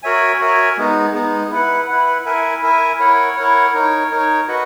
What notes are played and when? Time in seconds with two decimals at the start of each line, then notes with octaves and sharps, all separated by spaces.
0.03 F#4 A#4 C#5 E5 G#5
0.39 F#4 A#4 C#5 E5 G#5
0.77 G#3 B3 D#4
1.13 G#3 B3 D#4
1.51 E4 B4 F#5
1.88 E4 B4 F#5
2.25 E4 A#4 E5 G#5
2.63 E4 A#4 E5 G#5
3.00 E4 A#4 C#5 F#5
3.37 E4 A#4 C#5 F#5
3.73 D#4 A#4 C#5
4.11 D#4 A#4 C#5
4.48 F#4 B4 D#5 F#5